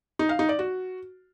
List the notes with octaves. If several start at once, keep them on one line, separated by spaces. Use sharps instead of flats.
D#4
F5
D#4
D5
F#4